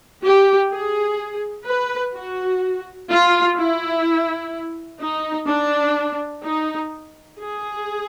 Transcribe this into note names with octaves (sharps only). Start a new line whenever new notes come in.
G4
G#4
B4
F#4
F4
E4
D#4
D4
D#4
G#4